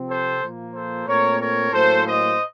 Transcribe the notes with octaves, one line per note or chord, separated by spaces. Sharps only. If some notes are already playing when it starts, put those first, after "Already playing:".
Already playing: C3 F3 C4
A4 C5
A#2 F3 A#3
A4 C5
A#2 A3 C4 A#4 C#5
A#4 C#5
A2 F#3 A#3 C#4 A4 C5
C5 D#5